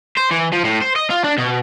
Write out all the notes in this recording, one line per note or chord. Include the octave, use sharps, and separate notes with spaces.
C5
E3
F3
A2
C5
D#5
F4
D4
B2